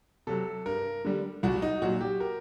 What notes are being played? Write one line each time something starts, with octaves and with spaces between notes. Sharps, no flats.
C3 F#3 A4
G2 A#4
D3 G3
C2 F#4
D#4
A#2 F#3 F#4
G4
A#4